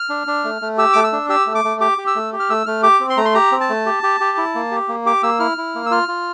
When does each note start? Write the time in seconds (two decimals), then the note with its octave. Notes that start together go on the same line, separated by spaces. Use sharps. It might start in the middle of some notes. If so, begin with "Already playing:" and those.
Already playing: F6
0.09 D4
0.27 D4
0.44 A3
0.62 A3
0.78 G4 E6
0.93 A3 D6
1.04 E6
1.13 D4
1.29 G4 E6
1.47 A3
1.55 D6
1.64 A3
1.81 G4 D6
1.98 G4
2.07 E6
2.15 A3
2.33 G4
2.40 F6
2.50 A3 E6
2.66 A3 F6
2.83 G4 D6
3.00 C4
3.10 C6
3.17 A3 A#5
3.25 C6
3.34 G4 A#5
3.52 C4
3.61 A5
3.69 A3
3.86 G4
4.03 G4
4.20 G4
4.37 E4
4.55 A#3
4.71 G4
4.88 A#3
5.06 G4 D6
5.23 A#3 E6
5.40 E4 F6
5.58 E4
5.75 A#3
5.86 E6
5.91 F4 F6
6.08 F4